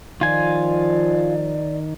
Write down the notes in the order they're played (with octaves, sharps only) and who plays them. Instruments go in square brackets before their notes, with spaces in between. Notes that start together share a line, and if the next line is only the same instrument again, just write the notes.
[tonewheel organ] D#3 [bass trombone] F3 [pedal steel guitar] F4 G#5 [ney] D5